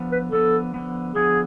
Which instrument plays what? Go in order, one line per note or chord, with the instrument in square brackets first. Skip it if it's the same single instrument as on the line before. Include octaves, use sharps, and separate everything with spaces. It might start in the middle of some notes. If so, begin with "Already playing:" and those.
Already playing: [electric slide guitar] D3 F3 B3
[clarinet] B4
[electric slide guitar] D3 F3 B3 [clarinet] A4
[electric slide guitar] D3 F3 B3
[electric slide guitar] D3 F3 B3 [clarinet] G#4